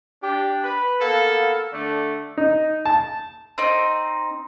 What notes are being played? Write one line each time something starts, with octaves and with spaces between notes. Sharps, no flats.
D4 G4
B4
A#3 B3 A4 F5
D3 A3 D4
D#4
A5
C4 D#4